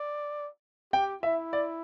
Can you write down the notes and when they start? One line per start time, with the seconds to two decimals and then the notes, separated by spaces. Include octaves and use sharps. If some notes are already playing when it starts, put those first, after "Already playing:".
Already playing: D5
0.93 G4 G5
1.23 E4 E5
1.53 D5